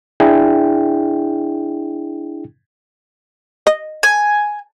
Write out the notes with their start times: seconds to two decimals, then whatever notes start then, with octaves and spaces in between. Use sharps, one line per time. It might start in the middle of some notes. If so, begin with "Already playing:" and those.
0.20 D4 E4 G#4 G5
3.67 D#5
4.03 G#5